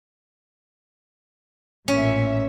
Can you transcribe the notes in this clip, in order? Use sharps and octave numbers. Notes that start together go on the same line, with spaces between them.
A1 A#2 C#4 E5